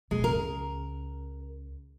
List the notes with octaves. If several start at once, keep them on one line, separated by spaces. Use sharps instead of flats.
B2 G#3
C#2 A#4